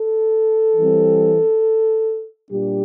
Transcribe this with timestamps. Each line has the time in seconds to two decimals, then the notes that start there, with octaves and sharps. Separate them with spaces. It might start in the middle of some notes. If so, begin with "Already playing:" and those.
Already playing: A4
0.76 E3 G3 C4
2.50 A#2 G3 D4 G4